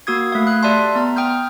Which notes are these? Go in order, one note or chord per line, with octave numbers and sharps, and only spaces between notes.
A#3 F#4 D#6 G#6
A3 F5
F#6
G4 D5 E5 A5 C6
B3 A#5
G5 D#6 F6 G6